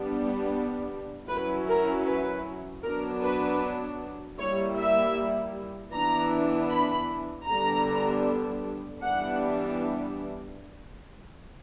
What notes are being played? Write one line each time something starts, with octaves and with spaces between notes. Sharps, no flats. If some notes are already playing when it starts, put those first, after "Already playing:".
Already playing: G3 B3 D4
F#3 C#4 E4 B4
A#4
B4
F#3 B3 D4 A#4
B4
G3 A#3 E4 C#5
E5
E3 B3 D4 A#5
B5
D3 G3 B3 D4 A#5
E3 G3 B3 D4 F#5